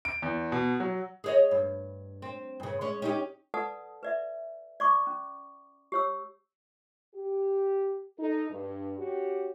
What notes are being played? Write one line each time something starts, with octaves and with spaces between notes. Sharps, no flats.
D7
E2
B2
F#3
G#4 C#5 D#5
G2
C4
G2 C#3
G#3 C#4
C#4 D#4 G4
A4 B4 D5 F#5 A5 D#6
B4 D5 E5
D5 C#6 D6
C#4
G4 C#5 E6
G4
D#4 A4
G2
C#4 F#4 G4